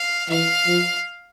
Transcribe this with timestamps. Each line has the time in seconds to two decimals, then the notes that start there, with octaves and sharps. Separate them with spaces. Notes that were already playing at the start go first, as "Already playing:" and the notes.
Already playing: F5
0.29 E3 F5
0.67 F3